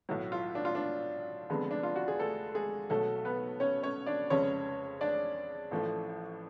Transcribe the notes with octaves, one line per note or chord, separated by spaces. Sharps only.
B1 A2 F#3
F4
D4
F4
D4
F1 F2 D3 G#3 B3
D4
F4
F#4
G#4
A3 A4
G#3 G#4
B1 B2 F#3 A3 A4
B3 B4
C#4 C#5
C#4 C#5
D4 D5
F1 F2 C#3 G#3 C#4 C#5
D4 D5
A1 A2 F3 A3